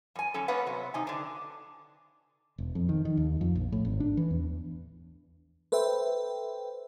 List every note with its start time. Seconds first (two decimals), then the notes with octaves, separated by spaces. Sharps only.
0.15 F#2 G#5
0.34 D3 F#3 C#4 A4
0.48 A#3 B3 C#4 B4 F#5
0.66 C3 F#3 C5
0.94 C3 D#4 G#5
1.07 D3 D4
2.58 E1
2.75 F2
2.89 D#3
3.05 D#3
3.17 D#2
3.41 F2
3.55 A#1
3.72 A2
3.85 G#1
4.00 D4
4.17 E3
4.30 E2
5.72 A4 B4 C5 E5 G5